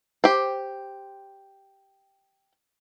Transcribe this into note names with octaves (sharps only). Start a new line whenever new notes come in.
G4 C5